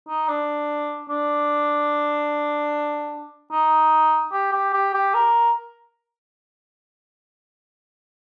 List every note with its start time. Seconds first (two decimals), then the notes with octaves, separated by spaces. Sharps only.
0.08 D#4
0.28 D4
1.09 D4
3.52 D#4
4.32 G4
4.52 G4
4.73 G4
4.94 G4
5.14 A#4